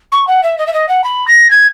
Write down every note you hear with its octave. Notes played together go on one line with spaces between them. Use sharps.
C#6
F#5
E5
D#5
E5
D#5
F#5
B5
A#6
G#6